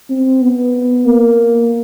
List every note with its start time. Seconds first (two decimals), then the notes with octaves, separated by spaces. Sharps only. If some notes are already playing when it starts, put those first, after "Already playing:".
0.10 C4
0.42 B3
1.06 A#3